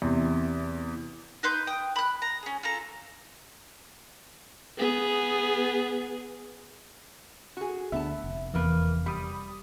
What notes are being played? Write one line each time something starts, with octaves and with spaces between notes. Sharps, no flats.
E2 C3
D#4 B4 C6 G6
G5 D#6
B5 F#6
A#5
C#4 G#4
F4 A4 A#5
B3 G#4
F#4 G#4
D2 D3 B3 E5 A5
F1
E2 C3 A#3 B4
G3 B5 D#6